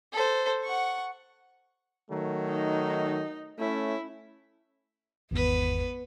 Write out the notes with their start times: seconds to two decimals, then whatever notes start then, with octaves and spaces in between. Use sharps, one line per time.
0.13 A4 C5
0.64 F#5 C#6
2.10 D#3 F#3 A3
2.48 D#4
3.59 A3 C#4 E4
5.31 G#1 E2 B3 B4